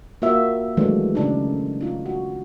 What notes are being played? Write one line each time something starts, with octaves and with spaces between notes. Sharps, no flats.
A#3 F4 F#4 E5
D#3 E3 F#3 G#3 A3 D4
C#3 D4 D#4
D#4 F4
F#4